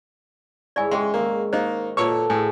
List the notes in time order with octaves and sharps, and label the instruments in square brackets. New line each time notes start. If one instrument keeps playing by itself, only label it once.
[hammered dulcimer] G#2 E4 C#5 [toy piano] D5 E5 G#5
[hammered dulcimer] C#3 [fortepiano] G#3 [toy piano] G#4 G5 C6
[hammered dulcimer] D#3 A#5 [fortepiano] A#3
[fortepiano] A#3 D#4 [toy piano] C5 D#5
[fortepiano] A#2 C#5 C#6 [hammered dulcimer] F#4 A4 [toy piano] B4
[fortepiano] A2 [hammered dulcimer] G#4 C#5 [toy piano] G#5